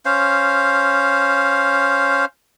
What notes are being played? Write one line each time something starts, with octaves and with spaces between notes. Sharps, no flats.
C#4 C5 F5